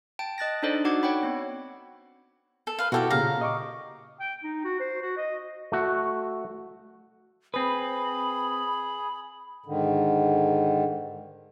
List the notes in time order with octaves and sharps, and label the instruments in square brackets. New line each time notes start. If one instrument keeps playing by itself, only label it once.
[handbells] G5 A5 D7
D#5 F#6 A6 A#6
D4 D#4 A4 C5 D5 D#5
D#4 F#4 F#5 D6 G#6
C#5 F#5 G5 B5
B3 C4
[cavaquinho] A4
B4 F5
[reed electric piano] B2 E4 A4 [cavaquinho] F#4 G4 E5
[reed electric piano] A#2 C#3 G4 [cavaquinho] F5 A#5
[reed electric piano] D#5 C#6 D6
[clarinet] G5
D#4
F#4
C5
F#4
D#5
[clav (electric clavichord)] A3 F#4
[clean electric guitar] C4 B4 [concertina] G#4 [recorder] B5
[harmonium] G#2 D3 D#3